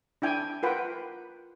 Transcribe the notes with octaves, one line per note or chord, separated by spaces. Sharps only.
D4 E4 G5 G#5
F4 A#4 B4 F#5 G5